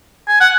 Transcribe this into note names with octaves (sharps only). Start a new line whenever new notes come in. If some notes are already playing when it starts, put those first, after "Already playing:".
G#5
F#5